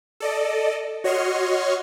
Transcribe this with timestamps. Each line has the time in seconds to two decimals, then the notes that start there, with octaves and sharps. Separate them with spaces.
0.20 A4 D5 D#5
1.04 F#4 C#5 D#5 C6 C#6 F6